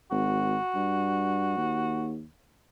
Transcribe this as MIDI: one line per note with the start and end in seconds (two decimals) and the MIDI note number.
0.11 0.57 32
0.11 2.12 66
0.75 1.53 43
1.57 2.26 39